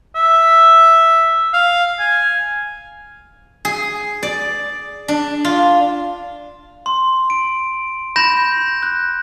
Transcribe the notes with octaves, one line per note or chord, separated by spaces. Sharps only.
E5
F5
G#5
G#4
D5
D4
F4
C6
D7
B5 G6 A#6 E7
F#6